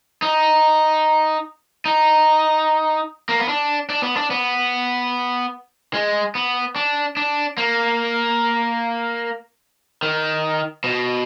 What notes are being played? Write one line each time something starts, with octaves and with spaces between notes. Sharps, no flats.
D#4
D#4
A#3
B3
D4
D4
B3
D4
B3
G#3
B3
D4
D4
A#3
D#3
B2